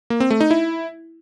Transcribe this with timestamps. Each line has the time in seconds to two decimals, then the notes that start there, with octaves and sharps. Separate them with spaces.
0.10 A#3
0.20 C4
0.30 A3
0.41 D#4
0.51 E4